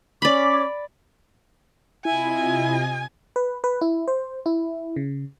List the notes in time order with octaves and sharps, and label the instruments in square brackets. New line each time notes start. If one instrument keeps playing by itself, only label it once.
[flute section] C#4 D6 [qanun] D5 B5
[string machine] C3 F4 D#5 [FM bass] E4 [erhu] G#5
[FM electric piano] B4
B4
E4
C5
E4
C#3